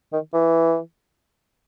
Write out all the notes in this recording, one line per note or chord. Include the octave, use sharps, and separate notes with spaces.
D#3
E3